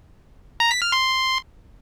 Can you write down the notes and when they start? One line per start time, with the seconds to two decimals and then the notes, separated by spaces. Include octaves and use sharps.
0.60 A#5
0.71 B6
0.82 F6
0.92 C6